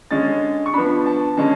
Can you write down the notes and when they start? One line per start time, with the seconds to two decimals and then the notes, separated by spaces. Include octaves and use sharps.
0.11 D3 G#3 C#4 A6
0.66 C#6
0.73 F3 B3 D4 B5
1.06 A5
1.37 D3 G#3 C#4 A5